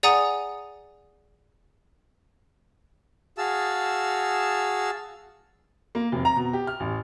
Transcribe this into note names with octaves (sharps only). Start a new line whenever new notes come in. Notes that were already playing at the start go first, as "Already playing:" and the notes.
G#4 D5 F#5 G#5 A#5 D#6
F#4 G#4 F5 A5 E6
A#3
F1
A#5
B2
G4
F6
A1